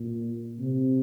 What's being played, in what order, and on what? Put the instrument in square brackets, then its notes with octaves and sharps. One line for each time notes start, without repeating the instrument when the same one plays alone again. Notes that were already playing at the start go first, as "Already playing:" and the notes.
Already playing: [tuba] A#2
C3